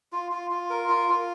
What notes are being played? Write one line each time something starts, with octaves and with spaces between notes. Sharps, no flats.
F4
F4
F4
A#4
F4
F4